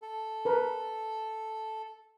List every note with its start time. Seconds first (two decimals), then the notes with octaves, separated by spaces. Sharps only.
0.02 A4
0.45 A#4 B4